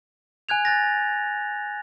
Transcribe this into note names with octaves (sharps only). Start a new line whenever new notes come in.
G#5 F#6 G#6 F7
F#6 A6 A#6